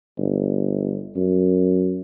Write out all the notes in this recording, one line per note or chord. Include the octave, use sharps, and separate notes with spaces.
G1
F#2